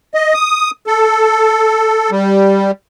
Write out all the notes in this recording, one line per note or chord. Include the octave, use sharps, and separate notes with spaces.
D#5
D#6
A4
G3